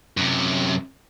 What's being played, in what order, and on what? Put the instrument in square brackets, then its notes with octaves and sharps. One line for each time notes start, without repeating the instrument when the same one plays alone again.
[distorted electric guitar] F#2 C3